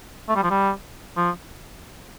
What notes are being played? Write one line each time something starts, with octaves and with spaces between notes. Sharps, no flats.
A3
G3
F3
G3
F3